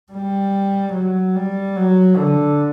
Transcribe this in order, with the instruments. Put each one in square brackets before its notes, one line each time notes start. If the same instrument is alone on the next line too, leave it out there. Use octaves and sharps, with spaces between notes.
[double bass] G3
F#3
G3
F#3
D3